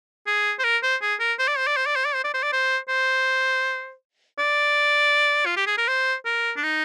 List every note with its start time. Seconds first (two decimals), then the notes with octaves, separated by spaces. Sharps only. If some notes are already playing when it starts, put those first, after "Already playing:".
0.27 G#4
0.59 C5
0.64 A#4
0.83 C5
1.02 G#4
1.20 A#4
1.39 C5
1.48 D5
1.58 C5
1.67 D5
1.77 C5
1.86 D5
1.96 C5
2.05 D5
2.15 C5
2.24 D5
2.34 C5
2.43 D5
2.53 C5
2.89 C5
4.39 D5
5.46 F4
5.57 G4
5.67 G#4
5.78 A#4
5.88 C5
6.26 A#4
6.57 D4
6.63 D#4